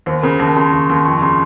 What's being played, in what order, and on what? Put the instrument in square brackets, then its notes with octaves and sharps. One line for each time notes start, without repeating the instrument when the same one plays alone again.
[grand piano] D#2 [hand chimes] C5
[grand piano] C#3 [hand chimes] A#4
[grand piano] D#2 [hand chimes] A5
[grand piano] C#3 [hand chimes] C6
[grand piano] D#2 [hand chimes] C#6
[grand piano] D#2 [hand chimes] C6
[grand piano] F2 [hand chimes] C#6
[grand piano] C#3 [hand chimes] C6